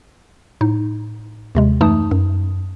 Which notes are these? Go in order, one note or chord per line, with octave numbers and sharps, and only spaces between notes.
A2 D#4
D#2 C3 G#3
F#2 E3 A3 D#4 A5 D#6
F#2